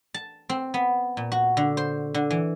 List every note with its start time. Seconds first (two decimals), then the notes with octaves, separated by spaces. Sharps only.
0.14 A5
0.49 C4
0.74 B3
1.17 A#2
1.32 F#4
1.57 D3
1.77 C5
2.14 D3
2.30 E3